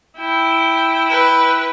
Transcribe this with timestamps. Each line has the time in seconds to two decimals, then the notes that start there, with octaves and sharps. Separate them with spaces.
0.19 E4 G5
1.10 B4